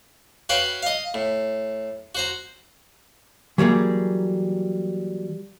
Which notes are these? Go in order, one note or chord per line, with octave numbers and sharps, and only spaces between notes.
F#4 B4 C#5 F5 G5
D#5 F5
A2
F#4 C5 A#5
E3 F#3 G3 A#3 G#4